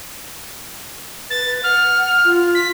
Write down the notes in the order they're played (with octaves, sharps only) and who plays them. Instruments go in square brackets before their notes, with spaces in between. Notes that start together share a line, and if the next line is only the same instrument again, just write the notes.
[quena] B4 [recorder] A6
[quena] F#5 [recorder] F6
[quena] F4
[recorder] B6